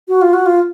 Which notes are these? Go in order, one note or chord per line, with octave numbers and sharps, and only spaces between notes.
F#4
F4
F#4
F4